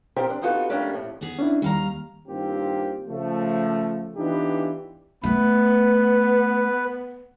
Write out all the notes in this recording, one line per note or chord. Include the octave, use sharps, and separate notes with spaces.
F3 C4 G4 A#4 C5
D4
B3 C4 D#4 F4 F#4 A4
F3 G3 A3 A#3 C#4 D4
F2 A2
B3 G#4
C#4 D4 E4
D#2 G3 F5 A#5
G2 D#3 A#3 C4 F4 G4
C#3 F3 A3
E3 B3 D4 D#4 F4 G4
A3 B3 B4